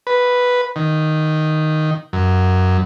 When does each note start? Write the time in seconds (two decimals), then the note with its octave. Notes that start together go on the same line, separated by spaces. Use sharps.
0.07 B4
0.76 D#3
2.13 F#2